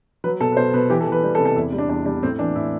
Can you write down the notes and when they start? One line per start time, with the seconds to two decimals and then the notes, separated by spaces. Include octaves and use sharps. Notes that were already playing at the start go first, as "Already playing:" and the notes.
0.24 F#3 B4
0.40 B2 A4
0.52 B4
0.57 B2 C5
0.73 B2 B4
0.90 E3 G4
1.01 A4
1.07 E3 B4
1.23 G3
1.35 A4
1.40 C3
1.45 A4
1.56 E2 E4
1.72 G3
1.78 D4
1.89 E2 D4
2.06 G3 D4
2.23 A2 C4
2.39 E3 D4
2.55 A2 E4